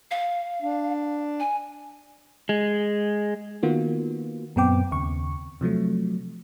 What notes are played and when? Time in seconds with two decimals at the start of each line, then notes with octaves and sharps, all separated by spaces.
0.11 F5
0.62 D4
1.40 G#5
2.49 G#3
3.63 D#3 A#3 B3 F4 F#4
4.56 F#2 A#2 B3 C4 G5 D6
4.91 D#2 C#3 C#6
5.61 C3 F3 F#3 A3